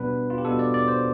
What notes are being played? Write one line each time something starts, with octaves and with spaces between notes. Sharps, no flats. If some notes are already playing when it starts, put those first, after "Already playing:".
Already playing: B2 G3 B3 D4 B4
F4
G4
B2 G3 B3 D4 A4
D5
D5
C5